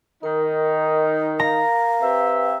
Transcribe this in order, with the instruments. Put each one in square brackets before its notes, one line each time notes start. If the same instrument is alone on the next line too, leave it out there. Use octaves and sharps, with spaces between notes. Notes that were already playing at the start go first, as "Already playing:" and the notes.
[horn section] D#3 D#4 [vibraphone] A#4
[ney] F5 [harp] A#5
[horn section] C4 G4 E5 [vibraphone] B4